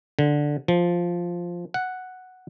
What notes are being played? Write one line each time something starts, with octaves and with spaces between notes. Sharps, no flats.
D3
F3
F#5